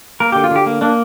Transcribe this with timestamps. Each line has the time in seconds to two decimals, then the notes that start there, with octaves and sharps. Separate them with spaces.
0.20 A#3 A#4
0.32 D3 G4
0.44 F4
0.51 D3 G4
0.66 A#3
0.81 A#3 D4